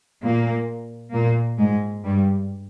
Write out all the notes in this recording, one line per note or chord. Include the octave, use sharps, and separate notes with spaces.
A#2 A#3
A#2 A#3
G#2 G#3
G2 G3